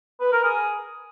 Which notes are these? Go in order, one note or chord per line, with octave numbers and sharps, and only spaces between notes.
B4
A#4
G#4